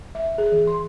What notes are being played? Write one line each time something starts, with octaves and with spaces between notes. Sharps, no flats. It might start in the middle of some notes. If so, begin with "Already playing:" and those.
E5
G#4
E3
C6